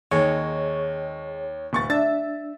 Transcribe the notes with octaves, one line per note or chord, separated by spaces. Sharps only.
D#2 G#3 C4 D#4 G#4 C#5
D1 C#6 A6
D4 E5 A6